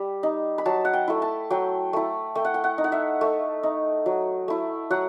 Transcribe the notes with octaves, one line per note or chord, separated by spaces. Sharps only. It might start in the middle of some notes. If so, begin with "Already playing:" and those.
Already playing: G3 G5
D#4
B5
F#3 A5
F#5
G5
A3 E4
A5
F#3 G5
A3 E4
A3 G5
F#5
G5
F#5
D#4
F#5
E5
A3
D#4
F#3
A3 E4
F#3 F#5